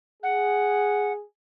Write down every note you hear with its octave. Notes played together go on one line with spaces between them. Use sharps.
G#4 F#5